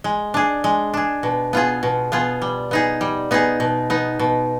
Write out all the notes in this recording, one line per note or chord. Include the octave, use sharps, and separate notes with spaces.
G#3
D4 G#4
G#3
D4 G#4
B2
B3 F4 G#4
B2
B3 F4 G#4
G3
B3 D#4 G#4
G3
B3 D#4 G#4
B2
B3 D#4
B2